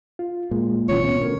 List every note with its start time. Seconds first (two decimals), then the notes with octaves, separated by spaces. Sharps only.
0.19 F4
0.51 A#2 G#3
0.89 D1 B2 E3 C#4 F4 C#5
1.03 B3 C#4
1.21 D2 A#4